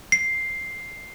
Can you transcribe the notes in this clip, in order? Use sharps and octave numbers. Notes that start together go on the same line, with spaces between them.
C7